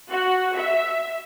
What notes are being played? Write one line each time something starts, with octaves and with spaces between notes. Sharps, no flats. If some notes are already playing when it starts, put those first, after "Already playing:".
F#4
E5